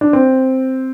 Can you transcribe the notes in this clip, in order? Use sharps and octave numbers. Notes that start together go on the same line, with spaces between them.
D4
C4